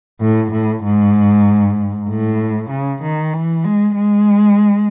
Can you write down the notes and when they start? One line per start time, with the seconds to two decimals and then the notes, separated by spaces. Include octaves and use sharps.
0.21 A2
0.51 A2
0.84 G#2
2.09 A2
2.70 C#3
3.02 D#3
3.33 E3
3.65 G#3
3.95 G#3